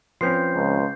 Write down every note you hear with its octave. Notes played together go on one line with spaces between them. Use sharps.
F3 C4 C#4 B4 C6 G6 C7
C#2